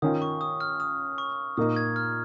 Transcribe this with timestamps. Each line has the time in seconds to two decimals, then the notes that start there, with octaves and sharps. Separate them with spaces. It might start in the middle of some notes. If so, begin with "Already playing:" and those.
0.02 D#3 C#4 F4 D#6
0.22 C#6
0.41 D#6
0.61 F6
0.80 D#6
1.18 C#6
1.57 A#2 A#3 D#4 D#6
1.76 G#6
1.96 F6